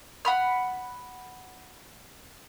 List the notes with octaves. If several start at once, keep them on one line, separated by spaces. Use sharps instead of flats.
F#5 B5 F6